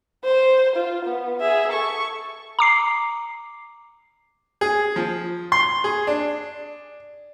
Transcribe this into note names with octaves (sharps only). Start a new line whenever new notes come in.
C5
F4
B3
G#4 E5
A4 C#6
A#5 D6 C7
G#4
F3
C6
G#4
D4